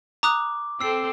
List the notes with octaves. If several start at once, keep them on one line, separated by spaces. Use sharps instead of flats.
A#5 D6 D#6 F#6
C4 A4 E6 C7